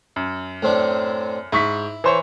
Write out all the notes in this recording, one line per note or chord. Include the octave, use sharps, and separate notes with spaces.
F#2
A2 C4 D4
G#2 E4 C#6 B6
E3 C5 C#5